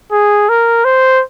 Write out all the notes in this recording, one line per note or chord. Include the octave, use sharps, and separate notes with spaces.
G#4
A#4
C5